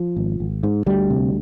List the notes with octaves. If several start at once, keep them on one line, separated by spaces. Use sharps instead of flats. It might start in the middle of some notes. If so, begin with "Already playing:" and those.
Already playing: F3
G#1
G#1
G#2
D2 G3
C3